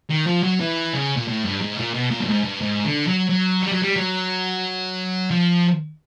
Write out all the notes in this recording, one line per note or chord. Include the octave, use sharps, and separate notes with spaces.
D#3
F3
F#3
E3
C#3
A#2
A2
G2
G#2
A#2
B2
A#2
G2
G#2
G2
G#2
D3
F#3
F#3
G3
F#3
G3
F#3
F3